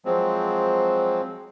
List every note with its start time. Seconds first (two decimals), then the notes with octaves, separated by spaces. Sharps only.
0.05 F3 F#3 G#3 C4